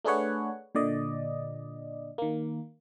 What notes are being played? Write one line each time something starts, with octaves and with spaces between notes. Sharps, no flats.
A3 D4 G#4 B4 C#5 F#5
A#2 D3 D5 D#5
D#3 A#3